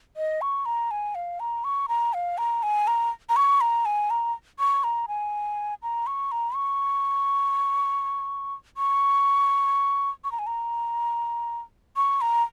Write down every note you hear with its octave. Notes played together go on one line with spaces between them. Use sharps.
D#5
C#6
A#5
G#5
F5
A#5
C#6
A#5
F5
A#5
G#5
A#5
A#5
C#6
A#5
G#5
A#5
C#6
A#5
G#5
A#5
C#6
A#5
C#6
C#6
C#6
A#5
G#5
A#5
C#6
A#5